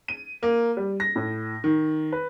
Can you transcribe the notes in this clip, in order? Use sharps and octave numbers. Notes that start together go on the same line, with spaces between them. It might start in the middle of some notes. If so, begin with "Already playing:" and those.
D#7
A#3
G3
A#6
A2
D#3
B4